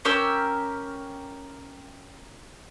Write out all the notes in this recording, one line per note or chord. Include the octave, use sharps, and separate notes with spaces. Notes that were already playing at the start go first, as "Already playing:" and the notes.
C#4 G4 A#4 E6